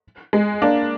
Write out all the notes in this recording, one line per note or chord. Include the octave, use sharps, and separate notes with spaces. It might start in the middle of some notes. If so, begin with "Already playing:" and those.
G#3
A#3 D4